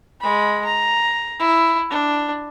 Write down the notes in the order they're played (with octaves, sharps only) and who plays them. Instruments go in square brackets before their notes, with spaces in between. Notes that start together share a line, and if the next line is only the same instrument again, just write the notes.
[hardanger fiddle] G#3 B5
A#5
E4
D4